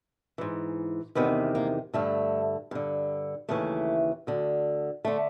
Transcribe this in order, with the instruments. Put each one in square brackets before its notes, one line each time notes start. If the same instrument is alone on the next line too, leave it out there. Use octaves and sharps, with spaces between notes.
[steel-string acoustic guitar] G#2 E3
E2 C3 D#3 B3
A#3
G2 D3 A3
G2 D3
D#2 C#3 E3 A3
D2 D3
D3 A3